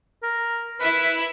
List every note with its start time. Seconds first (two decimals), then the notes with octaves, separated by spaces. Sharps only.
0.23 A#4
0.80 E4 B4 E5